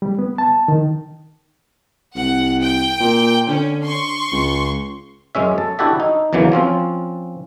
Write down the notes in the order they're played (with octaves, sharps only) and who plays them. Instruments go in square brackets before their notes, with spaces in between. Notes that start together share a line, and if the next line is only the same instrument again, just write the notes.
[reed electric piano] G3
B3
A5
D#3
[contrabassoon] C2 [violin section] F#5
[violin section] G5
[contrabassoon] A#2
[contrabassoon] D3 [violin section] C#4
[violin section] C6 C#6
[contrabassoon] C#2
[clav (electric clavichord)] F#2 G#3 C#4 E5
A4
D4 E4 F#4 G4 A4 E5
D#4
E2 C#3 E3 F#3 A#3
F3 C4 C#4 F4